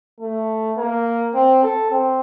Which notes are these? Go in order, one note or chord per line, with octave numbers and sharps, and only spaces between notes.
A3
A#3
C4
A4
C4